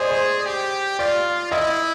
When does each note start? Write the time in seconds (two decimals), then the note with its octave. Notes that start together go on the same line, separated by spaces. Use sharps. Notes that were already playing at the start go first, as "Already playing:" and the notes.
Already playing: G#4 C5 D5 D#5
0.11 C5
0.46 G4
0.99 F4 D5
1.51 E4 D#5